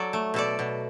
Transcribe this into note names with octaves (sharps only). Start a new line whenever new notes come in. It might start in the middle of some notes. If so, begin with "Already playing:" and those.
Already playing: F#3 A4 D5
A3
B2 A4 D5
B2